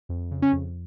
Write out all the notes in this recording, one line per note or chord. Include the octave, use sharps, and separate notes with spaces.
F2
C#3
C#4
F2